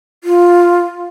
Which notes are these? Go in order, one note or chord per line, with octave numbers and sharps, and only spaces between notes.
F4